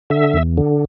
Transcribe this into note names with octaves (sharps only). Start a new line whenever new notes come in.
D3 E5
E2
D3